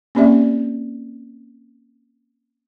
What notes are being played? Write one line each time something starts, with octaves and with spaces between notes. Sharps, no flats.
A#3 C4 C#4 G4 D5 E5